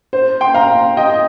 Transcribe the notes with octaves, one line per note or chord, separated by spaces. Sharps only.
C5
G5 C6
F5 A#5
D#5 G5
D#5